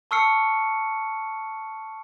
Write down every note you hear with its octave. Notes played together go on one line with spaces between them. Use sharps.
A5 C#6 E6 F6 C7 C#7